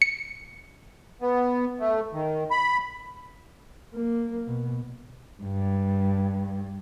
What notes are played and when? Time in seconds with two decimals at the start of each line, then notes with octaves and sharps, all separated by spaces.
0.02 C#7
1.22 B3
1.80 A3
2.13 D#3
2.51 B5
3.95 A#3
4.47 B2
5.44 G2